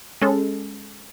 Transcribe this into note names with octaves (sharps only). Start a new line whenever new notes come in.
G#3 C#4 A4